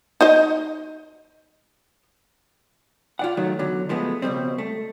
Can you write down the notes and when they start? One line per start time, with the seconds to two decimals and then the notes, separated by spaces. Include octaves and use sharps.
0.21 D#4 C5 D#5
3.19 F4 D5 F#5
3.37 D#3 F#3 A3
3.59 E2 D3 F#3
3.89 F3 G#3 A3 B3
4.22 C#2 B2 G3 C4
4.58 A3